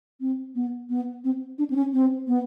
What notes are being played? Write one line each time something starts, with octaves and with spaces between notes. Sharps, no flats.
C4
B3
B3
C4
D4
C4
C#4
C4
B3